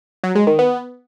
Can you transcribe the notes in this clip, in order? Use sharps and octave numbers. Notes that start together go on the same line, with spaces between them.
F#3
G#3
D#3
B3